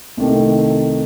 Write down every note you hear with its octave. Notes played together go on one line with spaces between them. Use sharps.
C2 C3 D#3 A3